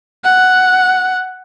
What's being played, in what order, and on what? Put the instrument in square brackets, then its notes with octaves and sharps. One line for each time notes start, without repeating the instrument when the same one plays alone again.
[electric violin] F#5